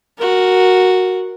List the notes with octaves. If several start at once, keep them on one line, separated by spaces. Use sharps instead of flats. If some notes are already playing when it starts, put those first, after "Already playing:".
F#4 A#4